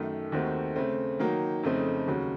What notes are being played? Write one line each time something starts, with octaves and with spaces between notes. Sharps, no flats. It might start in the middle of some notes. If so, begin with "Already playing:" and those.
Already playing: F#2 D#3 A3
D#2 D#3 A3 C4 F#4
C#3 A3 C4
D#3 F#3 A#3 D#4
F2 C#3 A3 C4 D#4
D#2 C#3 F#3